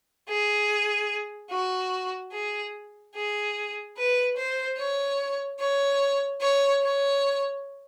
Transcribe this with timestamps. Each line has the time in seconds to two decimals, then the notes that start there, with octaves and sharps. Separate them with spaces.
0.29 G#4
1.51 F#4
2.33 G#4
3.15 G#4
3.97 B4
4.37 C5
4.78 C#5
5.60 C#5
6.41 C#5
6.83 C#5